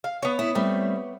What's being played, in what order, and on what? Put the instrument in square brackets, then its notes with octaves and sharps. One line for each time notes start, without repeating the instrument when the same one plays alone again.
[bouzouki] F5
B3 C#5
[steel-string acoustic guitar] E4
G3 A3 C4